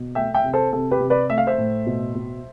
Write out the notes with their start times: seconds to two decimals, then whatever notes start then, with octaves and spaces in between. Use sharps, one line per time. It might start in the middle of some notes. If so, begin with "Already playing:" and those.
Already playing: B2
0.15 A3 E5 G5
0.34 E5 G5
0.44 C3
0.53 A4 C5
0.73 C3 A4
0.91 G4 B4
1.00 C3
1.10 B4 D5
1.30 A3 E5
1.38 F5
1.47 C5 E5
1.58 A2
1.86 B2
2.15 B2